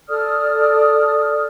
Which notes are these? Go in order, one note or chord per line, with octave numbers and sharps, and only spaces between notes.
A4 D5 D#6 F6